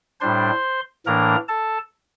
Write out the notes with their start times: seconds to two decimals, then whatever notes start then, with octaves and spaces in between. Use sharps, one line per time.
0.20 A2 G3 D4 C5 C6
1.06 A2 E3 A#3 D4 A#4 A#5
1.48 A4 A5